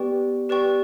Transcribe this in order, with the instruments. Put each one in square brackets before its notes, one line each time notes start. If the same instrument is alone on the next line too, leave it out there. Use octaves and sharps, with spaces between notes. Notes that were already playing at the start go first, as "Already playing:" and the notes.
Already playing: [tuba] B3 [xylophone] G4 B4 D5 G5 C#6
[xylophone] G4 B4 D5 G5 C#6